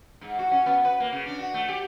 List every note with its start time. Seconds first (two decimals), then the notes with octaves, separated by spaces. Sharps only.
0.21 G#2
0.39 F#4
0.51 C#4
0.66 B3
0.85 B4
1.00 A#3
1.13 C#3
1.26 D4
1.39 F#4
1.54 A3
1.68 G4